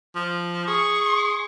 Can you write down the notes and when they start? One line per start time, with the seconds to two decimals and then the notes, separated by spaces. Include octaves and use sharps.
0.15 F3
0.68 G#4 C#6